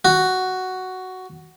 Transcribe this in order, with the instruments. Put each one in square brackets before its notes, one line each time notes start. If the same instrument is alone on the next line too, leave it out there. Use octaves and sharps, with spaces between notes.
[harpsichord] F#4